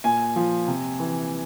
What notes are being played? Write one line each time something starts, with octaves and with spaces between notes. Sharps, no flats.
A#2 G#5
F3
C3
E3